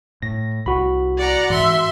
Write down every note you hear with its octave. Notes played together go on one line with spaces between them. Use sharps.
A2 A#6
C2 F#4 B5
D5 F#5 A#5
G#2 E3 E5 C6